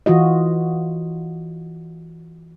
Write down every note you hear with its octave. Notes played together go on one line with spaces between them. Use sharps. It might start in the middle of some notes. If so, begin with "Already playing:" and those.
E3 F4 F#4 D#5